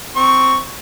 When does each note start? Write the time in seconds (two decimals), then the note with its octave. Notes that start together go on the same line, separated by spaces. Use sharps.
0.16 C4 C#6